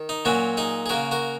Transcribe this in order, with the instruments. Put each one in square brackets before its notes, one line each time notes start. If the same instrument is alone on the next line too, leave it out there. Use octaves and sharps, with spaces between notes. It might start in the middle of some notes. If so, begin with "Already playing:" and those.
Already playing: [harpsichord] D#3
D#4
A#2 F#3 A#3 C#4 F#4
D#4 G#4
G#4
C#3 A#3 F#4 A#4
F#4 A#4